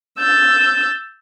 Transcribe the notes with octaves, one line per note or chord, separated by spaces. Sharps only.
E6 G6 A6